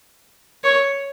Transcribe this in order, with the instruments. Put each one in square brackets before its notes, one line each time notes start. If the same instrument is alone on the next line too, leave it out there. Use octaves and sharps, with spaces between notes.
[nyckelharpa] C#5